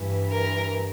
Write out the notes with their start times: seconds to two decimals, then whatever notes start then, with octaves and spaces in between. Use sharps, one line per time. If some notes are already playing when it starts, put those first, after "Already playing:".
Already playing: G2 E3
0.30 A#4